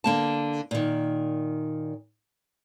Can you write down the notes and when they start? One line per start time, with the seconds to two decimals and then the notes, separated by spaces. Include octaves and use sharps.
0.04 D3 A#3 A5
0.71 A#2 D#3